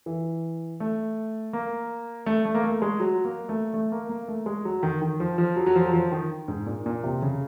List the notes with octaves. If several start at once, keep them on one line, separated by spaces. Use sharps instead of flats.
E3
A3
A#3
A3
A3
A#3
A3
G#3
F#3
A#3
A3
A3
A#3
A#3
A3
G#3
F#3
D#3
D#3
F3
F3
F#3
F#3
F3
F#3
F3
D#3
G#2
A#2
A#2
C3
C#3